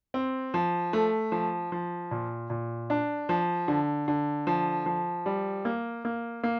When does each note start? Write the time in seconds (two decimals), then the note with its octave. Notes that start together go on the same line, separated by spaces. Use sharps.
0.14 C4
0.54 F3
0.93 A3
1.32 F3
1.72 F3
2.11 A#2
2.50 A#2
2.90 D4
3.29 F3
3.68 D3
4.08 D3
4.47 F3
4.86 F3
5.26 G3
5.65 A#3
6.05 A#3
6.43 A#3